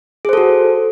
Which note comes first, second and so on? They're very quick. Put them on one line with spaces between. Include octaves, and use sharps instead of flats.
G#4 C5 A4 F#4